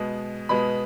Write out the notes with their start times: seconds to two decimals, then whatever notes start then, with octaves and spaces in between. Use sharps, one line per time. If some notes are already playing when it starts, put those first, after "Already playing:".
Already playing: B2 G#3 B3
0.49 B2 G#3 B3 B5